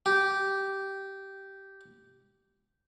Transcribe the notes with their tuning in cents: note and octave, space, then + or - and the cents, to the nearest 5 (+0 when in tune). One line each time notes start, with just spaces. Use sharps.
G4 -10